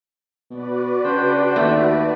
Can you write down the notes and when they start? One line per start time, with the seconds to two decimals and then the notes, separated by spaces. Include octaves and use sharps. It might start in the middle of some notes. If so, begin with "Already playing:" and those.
0.51 B2 F#4 B4 D5
1.04 C#3 D4 C5 G5
1.56 D#2 A3